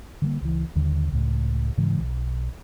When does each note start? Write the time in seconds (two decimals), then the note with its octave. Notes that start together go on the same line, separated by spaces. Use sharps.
0.22 D3 G3 A#3
0.41 C#2 E3
0.76 D#2 D3 G3
1.12 C#2 A2
1.78 G#2 C#3 E3 G#3
2.00 B1